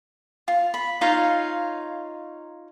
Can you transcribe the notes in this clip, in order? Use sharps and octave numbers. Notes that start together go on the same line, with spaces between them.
F4
B5
D#4 F4 C#5 F5